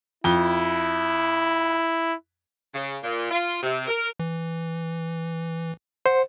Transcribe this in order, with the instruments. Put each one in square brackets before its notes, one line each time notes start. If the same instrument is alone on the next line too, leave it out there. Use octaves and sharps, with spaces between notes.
[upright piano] F2 G7 [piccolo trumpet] E4
[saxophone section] C#3
A#2
F4
C3
A#4
[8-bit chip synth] E3
[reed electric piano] C5 [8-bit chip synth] F#5